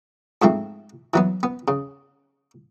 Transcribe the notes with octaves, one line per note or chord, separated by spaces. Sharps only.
G#2 F3 A3 C4
E3 F#3 B3
B3
C#3